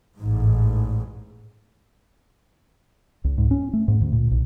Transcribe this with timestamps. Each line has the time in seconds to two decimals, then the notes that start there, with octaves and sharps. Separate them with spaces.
0.17 A1 G#2
3.24 C#2
3.38 G#2
3.51 C#4
3.73 A3
3.88 G#2
4.01 D2
4.12 A#2
4.31 B1